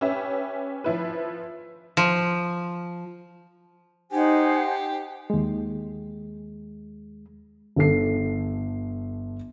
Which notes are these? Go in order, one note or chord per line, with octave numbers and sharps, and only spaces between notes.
C#4 G4 B4 E5
F3 E4 B4
F3
D#4 G4 C5 F#5 G#5
D#2 G#3
G1 A4 C7